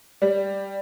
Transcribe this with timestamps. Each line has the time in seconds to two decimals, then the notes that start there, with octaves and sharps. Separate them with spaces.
0.22 G3